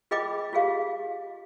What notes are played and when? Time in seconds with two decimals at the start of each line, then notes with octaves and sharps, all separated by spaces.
0.11 F4 G#4 D#5 G5 B5 D6
0.53 F4 G4 G#4 F5